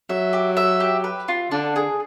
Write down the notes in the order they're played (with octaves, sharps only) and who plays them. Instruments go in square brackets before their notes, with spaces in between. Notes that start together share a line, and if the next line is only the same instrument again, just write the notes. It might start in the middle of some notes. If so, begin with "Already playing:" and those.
[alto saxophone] F#3 [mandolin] E5
[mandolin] G4
E5
G4
B4
F4
[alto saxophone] D3 [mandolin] D4
[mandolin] G#4